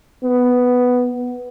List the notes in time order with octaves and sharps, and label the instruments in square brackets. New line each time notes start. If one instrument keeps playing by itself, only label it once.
[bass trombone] B3